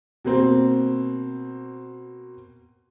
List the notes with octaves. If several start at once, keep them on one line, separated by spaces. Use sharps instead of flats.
B2 A#3 C4